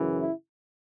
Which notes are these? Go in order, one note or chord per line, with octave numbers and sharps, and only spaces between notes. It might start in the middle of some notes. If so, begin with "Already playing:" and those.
Already playing: F#2 C#3 E3
E4